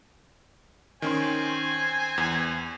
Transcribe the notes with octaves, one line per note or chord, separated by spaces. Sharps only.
D#3 C4 C#4 G#5 C6
E2